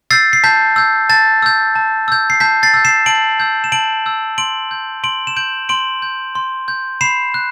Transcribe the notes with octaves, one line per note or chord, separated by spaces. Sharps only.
E6 G6 A6 C7
C7
A5 G6 B6
E6 G6
A5 A6
E6 G6
A5
E6 G6
C7
A5 G6 B6
A6 C7
E6 G6
C7 E7
A5 D7 F#7
E6 G6
E7
A5 D7 F#7
E6 G6
C6 D7 F#7
G6
C6 D7 F#7
E7
G6 D7 F#7
C6 D7 F#7
G6
C6
G6
B5 C7 E7
F#6